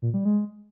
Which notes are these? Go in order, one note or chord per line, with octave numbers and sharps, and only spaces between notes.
A#2
G3
G#3